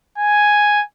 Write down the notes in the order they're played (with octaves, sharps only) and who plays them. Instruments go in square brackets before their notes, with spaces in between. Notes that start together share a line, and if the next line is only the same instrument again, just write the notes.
[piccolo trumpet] G#5